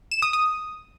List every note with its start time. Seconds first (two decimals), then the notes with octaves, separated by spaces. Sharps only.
0.11 E7
0.22 D#6
0.33 D#6